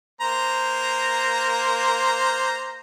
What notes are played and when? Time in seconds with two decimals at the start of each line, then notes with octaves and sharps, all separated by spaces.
0.21 A#3 C5 A#5